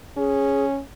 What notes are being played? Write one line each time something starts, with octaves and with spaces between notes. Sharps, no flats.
C#4 G#4